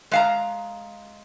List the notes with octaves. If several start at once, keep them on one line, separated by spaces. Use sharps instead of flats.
G#3 F5 A#5